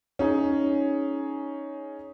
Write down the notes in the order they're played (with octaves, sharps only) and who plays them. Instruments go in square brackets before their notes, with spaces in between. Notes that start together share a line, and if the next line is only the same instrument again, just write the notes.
[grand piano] C#4 D#4 G#4